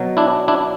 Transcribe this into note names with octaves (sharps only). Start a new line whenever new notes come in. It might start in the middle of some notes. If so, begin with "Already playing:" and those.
Already playing: B2 F#3
D4 E4
D4 E4